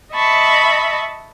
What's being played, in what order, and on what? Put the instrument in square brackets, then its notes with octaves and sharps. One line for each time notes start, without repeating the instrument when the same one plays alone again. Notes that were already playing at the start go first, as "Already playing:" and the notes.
[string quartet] D#5 E5 A5 B5 C#6